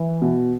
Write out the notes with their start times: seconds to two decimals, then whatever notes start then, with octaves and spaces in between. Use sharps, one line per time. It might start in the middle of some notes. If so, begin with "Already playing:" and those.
Already playing: E3
0.22 B2